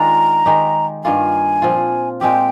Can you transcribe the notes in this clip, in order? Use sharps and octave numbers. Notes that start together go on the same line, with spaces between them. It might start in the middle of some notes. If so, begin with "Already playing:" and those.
Already playing: D#3 G#3 D4 F4 A#5
D#3 G#3 D#4 G4
G2 D#3 A#3 F4 G#5
A#2 F3 C4 F4
A#2 G#3 C4 G4 G5